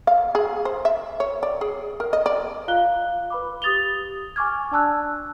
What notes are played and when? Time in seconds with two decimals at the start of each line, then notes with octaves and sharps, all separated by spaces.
0.07 F5
0.35 G#4
0.65 C5
0.85 E5
1.20 C#5
1.43 D5
1.61 G#4
2.00 A#4
2.13 D#5
2.26 D5
2.68 F4 F5 A#5 F#6 G7
3.30 B4 B5 D6
3.62 G4 D#6 A6 F7 G7
4.36 G#5 C#6 D6 F6 G#6
4.71 D4 D5 A5 E6 F#6